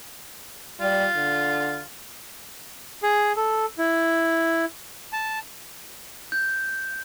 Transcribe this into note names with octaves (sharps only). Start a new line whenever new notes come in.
G3 F4
D3
G#4
A4
E4
A5
G6